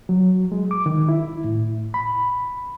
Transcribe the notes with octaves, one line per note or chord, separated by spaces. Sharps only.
F#3
G#3
D6
D#3
E4
A2
B5